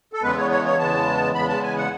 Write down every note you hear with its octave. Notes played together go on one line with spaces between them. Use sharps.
A4
E2 C#3 G#3 B3 B4
C#5
C#5
C#5
E2 C#3 G#3 B3 A5
E2 C#3 G#3 B3 B5
A5
G#5
F#5